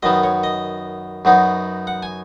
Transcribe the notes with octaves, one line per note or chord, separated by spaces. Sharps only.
F#2 D#3 B3 D#5
C#5
D#5
F#2 F#3 B3 D#4
F#5
G#5